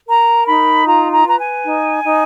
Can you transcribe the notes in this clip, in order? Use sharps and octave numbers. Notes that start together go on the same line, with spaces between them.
A#4 A#5
D#4 B5
F4 A#5
A#5
B4 A#5
G#5
D#4
D#4